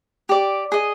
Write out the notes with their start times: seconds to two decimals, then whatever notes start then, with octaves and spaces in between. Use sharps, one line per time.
0.29 G4 D5
0.72 G#4 D#5